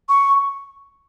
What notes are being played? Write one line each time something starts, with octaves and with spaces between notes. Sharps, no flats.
C#6